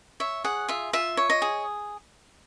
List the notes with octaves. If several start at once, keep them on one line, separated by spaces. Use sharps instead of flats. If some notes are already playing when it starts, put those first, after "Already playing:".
C#5 E5
G#4 F#5
F4 E5
F4 E5
C#5
D#5
G#4